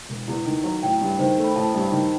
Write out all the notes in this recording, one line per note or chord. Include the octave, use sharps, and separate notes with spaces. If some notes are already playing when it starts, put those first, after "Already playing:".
E1
E2
D#3
F#3
A1 G5
G2
D#3 C5
A3
B5
A1 A5
G2
D#3